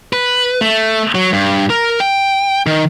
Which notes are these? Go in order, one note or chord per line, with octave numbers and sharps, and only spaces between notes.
B4
A3
F#3
G2
A#4
G5
D#3